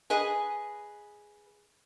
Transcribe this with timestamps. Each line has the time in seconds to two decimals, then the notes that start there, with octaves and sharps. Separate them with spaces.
0.10 G#4 B4 D#5